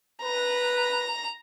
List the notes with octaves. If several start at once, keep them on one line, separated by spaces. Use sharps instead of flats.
B4 A#5